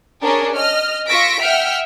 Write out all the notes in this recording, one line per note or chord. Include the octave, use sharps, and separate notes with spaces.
C#4 D4 G#4 A#4
D#5 F6
F4 C#6 E6 A#6 B6 D7
E5 F#5 G5 F6